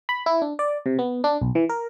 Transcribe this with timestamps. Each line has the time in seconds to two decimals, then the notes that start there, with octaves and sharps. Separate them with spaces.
0.09 B5
0.26 E4
0.42 D4
0.59 D5
0.86 C3
0.99 B3
1.24 D4
1.42 B1
1.55 E3
1.69 A#4